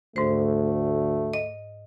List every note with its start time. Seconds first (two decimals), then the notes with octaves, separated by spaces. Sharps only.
0.16 D2 G#2 A3 C5
1.34 D#5